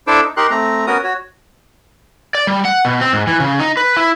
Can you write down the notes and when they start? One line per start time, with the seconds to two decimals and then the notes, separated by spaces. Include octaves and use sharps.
0.07 D4 E4 A4 C5 D6 E6
0.22 D#4
0.37 D#4 G4 A#4 C6 F#6
0.51 A3 C4 A#5
0.87 B3 C#4 F#4 A#4 D#6
1.04 F#4 C#5
2.35 D5
2.47 G3
2.65 F#5
2.85 B2
3.01 C4
3.13 G#2
3.27 E3
3.40 C#3
3.59 D#4
3.77 B4
3.97 E4